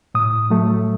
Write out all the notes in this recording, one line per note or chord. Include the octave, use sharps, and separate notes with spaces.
A2 D#6
F#3 A3